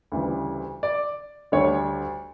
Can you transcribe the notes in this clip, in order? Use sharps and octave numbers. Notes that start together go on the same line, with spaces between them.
D2 C#3 E3 G3
D5
D2 D3 G3 C#5